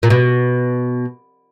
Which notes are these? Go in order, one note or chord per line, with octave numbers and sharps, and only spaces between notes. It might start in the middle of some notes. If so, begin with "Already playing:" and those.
A#2
B2